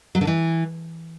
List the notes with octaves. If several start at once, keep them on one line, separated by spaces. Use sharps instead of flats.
F#3
D3
E3